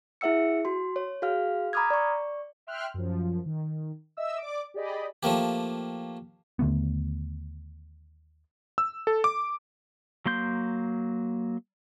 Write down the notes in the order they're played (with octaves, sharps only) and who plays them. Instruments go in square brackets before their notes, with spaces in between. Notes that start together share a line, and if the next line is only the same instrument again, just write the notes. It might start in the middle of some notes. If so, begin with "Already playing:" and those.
[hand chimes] E4 G#4 E5 F#5 E6 C#7
F#4 C6
C#5
F#4 G#4 F5 F6
A#5 B5 D6 D#6 F6 G#6
D5 C#6
[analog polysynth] E5 G5 C6 F6 F#6
F#2 F3
D#3
D#5 E5 E6
D5 D6
G4 G#4 D5 D#5 B5
[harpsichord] F3 A3 A#3 G4
[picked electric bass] D#2 D3 A3 B3
[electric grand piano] E6
A4
D6
[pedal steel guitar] F#3 A#3 C6 G6